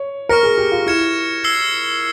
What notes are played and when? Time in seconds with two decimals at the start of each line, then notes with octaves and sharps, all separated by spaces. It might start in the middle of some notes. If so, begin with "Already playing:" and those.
Already playing: C#5
0.29 A#4 C#6 F6 A#6 C#7
0.43 G#4
0.58 G4
0.72 F4
0.86 E4 F6 G#6 C#7 E7
1.44 E6 G#6 C7 G7